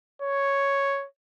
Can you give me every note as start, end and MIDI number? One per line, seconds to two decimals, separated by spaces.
0.22 1.06 73